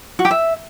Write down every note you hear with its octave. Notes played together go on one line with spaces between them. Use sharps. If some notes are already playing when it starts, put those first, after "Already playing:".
F#4
G4
E5